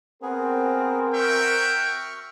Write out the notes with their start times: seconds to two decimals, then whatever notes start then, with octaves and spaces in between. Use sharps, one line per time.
0.22 B3 C4 G#4 A#4
1.13 F#4 E5 G5 C#6 F6